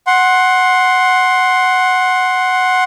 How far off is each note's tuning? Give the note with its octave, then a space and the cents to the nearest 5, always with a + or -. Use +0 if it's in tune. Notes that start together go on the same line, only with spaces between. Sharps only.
F#5 +0 C6 +10